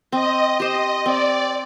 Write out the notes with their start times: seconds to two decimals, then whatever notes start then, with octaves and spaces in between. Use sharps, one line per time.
0.12 C4 D#5
0.59 G4 C5 D#5
1.06 C4 D5